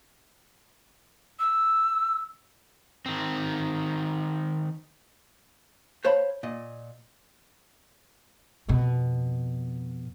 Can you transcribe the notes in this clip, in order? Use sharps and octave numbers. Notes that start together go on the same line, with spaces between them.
E6
D#3 C4
C5 C#5 F5 A5 B5
A#2 D#5
F2 B2